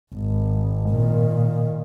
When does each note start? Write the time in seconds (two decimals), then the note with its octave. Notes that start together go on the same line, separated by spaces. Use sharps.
0.14 G#1
0.89 A#2 D#3